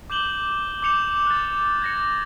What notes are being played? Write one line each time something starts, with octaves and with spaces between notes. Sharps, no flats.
D6 G6 E7 F#7 G7
D6 G6 C#7 F7
F#6 A6
G#6 A#6 C#7